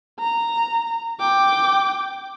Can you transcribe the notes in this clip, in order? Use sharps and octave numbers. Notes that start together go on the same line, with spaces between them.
A#5
G5 D6